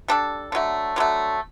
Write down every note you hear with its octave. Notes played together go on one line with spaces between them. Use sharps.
G3 D4 A4
D3 F#3 A3
D3 F#3 A3